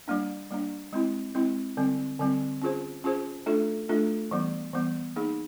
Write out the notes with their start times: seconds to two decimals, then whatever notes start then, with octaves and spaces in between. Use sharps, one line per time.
0.08 G3 A#3 D4
0.50 G3 A#3 D4
0.93 G#3 C4 E4
1.35 G#3 C4 E4
1.77 D3 G3 C4
2.20 D3 G3 C4
2.62 C#4 F4 G#4 C5
3.04 C#4 F4 G#4 C5
3.46 A3 D4 F4 A4
3.89 A3 D4 F4 A4
4.31 E3 G3 B3
4.73 E3 G3 B3
5.16 A#3 D#4 G#4